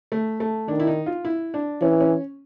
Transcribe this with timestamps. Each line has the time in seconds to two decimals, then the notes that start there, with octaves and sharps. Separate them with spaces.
0.12 A3
0.40 A3
0.68 D#3 D4
0.80 E4
0.87 D#4
1.06 F4
1.25 E4
1.54 D4
1.81 E3 C#4
2.01 C#4